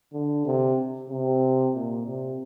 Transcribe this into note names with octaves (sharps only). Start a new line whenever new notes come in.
D3
C3
C3
A#2
C3